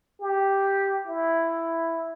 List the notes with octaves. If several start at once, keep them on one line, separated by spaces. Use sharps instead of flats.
G4
E4